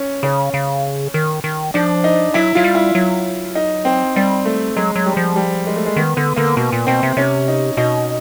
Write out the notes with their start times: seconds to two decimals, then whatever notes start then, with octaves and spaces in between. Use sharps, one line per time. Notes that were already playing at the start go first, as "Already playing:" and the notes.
Already playing: C#4
0.23 C#3 C#4
0.54 C#3
1.14 D#3
1.44 D#3
1.74 F3 D4
2.04 D#4
2.34 F#3 E4
2.55 F#3 F4
2.64 G3
2.75 E4
2.95 F#3
3.55 D#4
3.85 C4
4.16 G3 C4
4.45 A3
4.76 F#3 G#3
4.96 F#3
5.06 G3
5.17 F3
5.36 G3
5.67 G#3
5.76 A3
5.86 G#3
5.96 D#3 B3
6.17 D3 B3
6.36 D3 A#3
6.57 B2 B3
6.72 A#2
6.87 B2 C4
7.03 C3
7.17 C3 C#4
7.48 D#4
7.77 B2 D#4